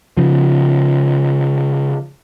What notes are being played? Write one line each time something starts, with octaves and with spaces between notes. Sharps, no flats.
C#3 F3